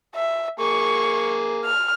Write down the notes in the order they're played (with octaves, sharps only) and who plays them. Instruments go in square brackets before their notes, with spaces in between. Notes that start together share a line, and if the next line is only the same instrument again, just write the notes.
[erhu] E5
[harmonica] A#3 G#4 [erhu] C#6
[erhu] F6